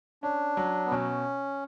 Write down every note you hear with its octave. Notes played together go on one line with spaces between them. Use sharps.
C#4 D4
F#3
B3
B2 C#4